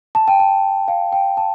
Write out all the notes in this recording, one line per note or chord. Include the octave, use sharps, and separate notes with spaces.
A5
G5
A5
F5
G5
A5